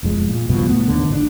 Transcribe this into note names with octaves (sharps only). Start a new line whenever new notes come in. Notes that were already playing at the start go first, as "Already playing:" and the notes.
E1 F2 G#3
A#2
C#2 G2 B2 F3
A2 A3 B3
D#2 D3
A1 A2 C4 D4